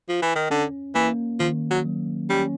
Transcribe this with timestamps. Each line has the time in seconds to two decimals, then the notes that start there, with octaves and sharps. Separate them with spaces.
0.09 F3
0.22 E3
0.36 D#3
0.50 D3 C#4
0.95 E3 A#3
1.40 D#3 F3
1.71 F#3
1.85 F#3
2.30 G3 C#4